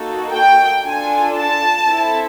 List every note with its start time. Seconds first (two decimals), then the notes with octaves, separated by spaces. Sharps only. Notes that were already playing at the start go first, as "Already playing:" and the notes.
Already playing: A#3 D#4 F#4 A4
0.34 G5
0.85 D4 F4 A4 G#5
1.37 A5
1.87 C4 E4 A4